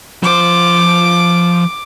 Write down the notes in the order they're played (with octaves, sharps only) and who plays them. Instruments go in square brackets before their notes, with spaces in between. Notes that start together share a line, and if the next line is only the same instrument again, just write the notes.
[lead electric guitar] F3 C5 [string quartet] D6